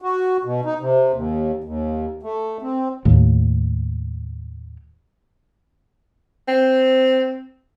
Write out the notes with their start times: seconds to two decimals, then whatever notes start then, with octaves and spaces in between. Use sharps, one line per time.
0.02 F#4
0.45 B2
0.65 D#4
0.80 C3
1.13 D#2
1.64 D#2
2.23 A3
2.62 C4
3.05 D#2 A2
6.48 C4